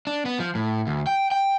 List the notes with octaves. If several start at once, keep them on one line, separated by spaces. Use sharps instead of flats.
D4
B3
F3
A2
D2
G5
G5